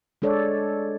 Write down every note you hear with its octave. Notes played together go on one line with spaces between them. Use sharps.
G#3 D4 A4 C#5 D5